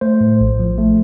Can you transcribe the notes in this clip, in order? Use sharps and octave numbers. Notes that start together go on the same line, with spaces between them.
A3 C5
A2
A#1
F3
A3